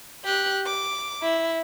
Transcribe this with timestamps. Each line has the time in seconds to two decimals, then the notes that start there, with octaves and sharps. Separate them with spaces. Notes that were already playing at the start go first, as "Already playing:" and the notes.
0.25 G4 F#6
0.66 D6
1.23 E4